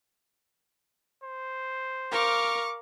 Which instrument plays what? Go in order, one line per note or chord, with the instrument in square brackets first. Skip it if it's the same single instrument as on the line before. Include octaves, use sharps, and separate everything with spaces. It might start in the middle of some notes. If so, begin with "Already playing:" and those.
[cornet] C5
[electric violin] A#4 F5 [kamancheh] C#6 D6